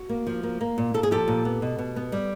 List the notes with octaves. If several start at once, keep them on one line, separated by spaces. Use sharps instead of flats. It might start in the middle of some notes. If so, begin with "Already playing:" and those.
Already playing: F#4
A#3
F3
A#3
A#3
A#2
A#2 A4
G#4
F3 G4 A4
A#2
B3
B2
B2
B3
G3